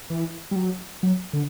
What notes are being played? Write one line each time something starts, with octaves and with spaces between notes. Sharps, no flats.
E3
G3
F#3
F#3
D3